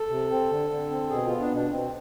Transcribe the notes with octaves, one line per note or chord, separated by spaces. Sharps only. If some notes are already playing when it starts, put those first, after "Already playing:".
Already playing: A4
C3
C4
D3
D3
C4
B2 G#4
B3 F4
D4
B2 D4
B2 C4